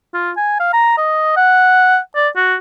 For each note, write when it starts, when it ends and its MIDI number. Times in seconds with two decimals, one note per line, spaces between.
0.14 0.31 65
0.37 0.56 80
0.60 0.70 77
0.73 0.95 82
0.97 1.36 75
1.37 1.98 78
2.15 2.28 74
2.36 2.56 66